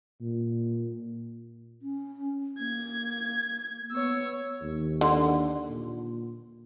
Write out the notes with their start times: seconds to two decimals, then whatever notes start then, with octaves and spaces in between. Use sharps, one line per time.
0.21 A#2
1.82 C#4
2.59 A#3 G#6
3.91 B3 C#5 E6
4.62 D#2
5.01 D3
5.69 A#2